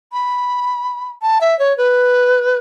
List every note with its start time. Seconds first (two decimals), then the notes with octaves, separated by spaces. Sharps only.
0.12 B5
1.22 A5
1.41 E5
1.59 C#5
1.77 B4